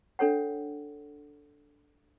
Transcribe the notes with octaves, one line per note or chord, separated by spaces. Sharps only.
D4 A4 C#5 F#5